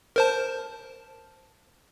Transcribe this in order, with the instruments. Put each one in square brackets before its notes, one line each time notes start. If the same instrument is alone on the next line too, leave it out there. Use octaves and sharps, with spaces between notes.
[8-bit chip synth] A#4 C5 A5